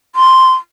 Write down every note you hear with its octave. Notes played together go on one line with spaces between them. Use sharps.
C6